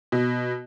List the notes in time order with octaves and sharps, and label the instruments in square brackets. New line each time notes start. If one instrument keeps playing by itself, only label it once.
[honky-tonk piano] B2